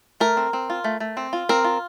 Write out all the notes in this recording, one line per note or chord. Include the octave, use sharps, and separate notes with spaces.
A3 A#4
C4
C4
F4
A3
A3
C4
F4
C4 A#4
F4